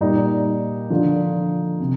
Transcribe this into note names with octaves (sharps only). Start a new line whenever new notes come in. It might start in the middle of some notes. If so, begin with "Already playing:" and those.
A#2 G3 D#4
D3 F3
C3